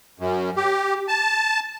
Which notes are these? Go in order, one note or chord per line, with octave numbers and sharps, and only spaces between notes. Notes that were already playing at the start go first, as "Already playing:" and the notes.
F#2
G4
A5